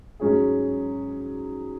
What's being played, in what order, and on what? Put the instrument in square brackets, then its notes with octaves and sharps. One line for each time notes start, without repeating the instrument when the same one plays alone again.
[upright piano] G#2 F#3 C#4 G#4